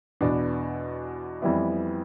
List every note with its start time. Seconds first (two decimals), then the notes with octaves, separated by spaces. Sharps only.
0.21 E2 B2 B3 D4
1.42 F2 E3 G3 B3 E4